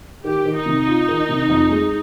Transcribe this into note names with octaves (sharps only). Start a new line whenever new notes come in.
D#3 G4
D#3
D#4
C3
F4
D#3
C3
F2
G#3